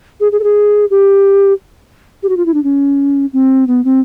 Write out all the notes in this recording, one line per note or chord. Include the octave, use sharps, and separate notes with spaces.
G#4
G#4
A4
G#4
G4
G4
F#4
F4
E4
D4
C#4
C4
B3
C4